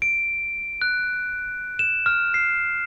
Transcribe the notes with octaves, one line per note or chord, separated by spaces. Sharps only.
D7
F#6
E7
F6
C7